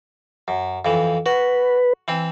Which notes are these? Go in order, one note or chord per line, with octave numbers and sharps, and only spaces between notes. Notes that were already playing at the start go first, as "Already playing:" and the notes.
F#2
F2 E3
F#4 B4
E3 C4